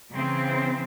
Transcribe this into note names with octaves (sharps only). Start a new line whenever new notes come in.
C#3 E3 C4